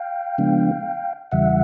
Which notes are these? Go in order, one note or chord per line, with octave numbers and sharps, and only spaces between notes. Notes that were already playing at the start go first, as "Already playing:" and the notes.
Already playing: F5 G5
C#3 F3 G#3 B3 D4
E2 C#3 E3 G3 E5 F#5